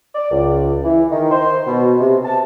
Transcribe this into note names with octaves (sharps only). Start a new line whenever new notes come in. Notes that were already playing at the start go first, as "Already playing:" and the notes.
D5
C#2
E3
D#3
C5
B2
C3
A5